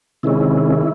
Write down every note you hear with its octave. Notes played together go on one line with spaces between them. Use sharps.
C3 D#3 G#3 C#4 E4